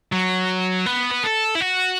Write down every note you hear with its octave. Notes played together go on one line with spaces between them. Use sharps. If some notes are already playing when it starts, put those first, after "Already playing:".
F#3
B3
B4
A4
E4
F#4